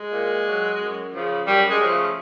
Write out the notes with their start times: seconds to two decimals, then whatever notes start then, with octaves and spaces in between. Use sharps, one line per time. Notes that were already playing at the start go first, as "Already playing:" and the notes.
Already playing: G#3
0.12 A#2
0.46 F#3
0.79 F#2
1.12 C#3 F3
1.46 F#2 G3
1.69 G#3
1.80 C#3 F3
1.91 A3